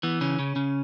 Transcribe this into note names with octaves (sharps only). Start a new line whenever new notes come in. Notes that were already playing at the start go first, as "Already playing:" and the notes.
E3 B3
C#3 C#4
C#3
C#3